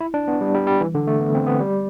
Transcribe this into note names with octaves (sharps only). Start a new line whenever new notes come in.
E4
D4
B3
G3
G3
G3
E3
D3
A3
B3
C4
B3
G3